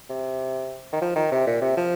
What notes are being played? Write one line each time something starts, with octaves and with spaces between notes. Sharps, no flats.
C3
D#3
F3
D#3
C3
A#2
C3
F3